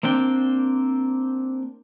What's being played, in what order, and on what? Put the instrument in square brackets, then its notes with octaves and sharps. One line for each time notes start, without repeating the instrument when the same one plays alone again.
[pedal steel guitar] A#3 C4 D4 G5